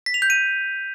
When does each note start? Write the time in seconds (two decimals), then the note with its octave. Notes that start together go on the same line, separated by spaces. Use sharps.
0.06 B6
0.14 F7
0.22 G6
0.30 D#7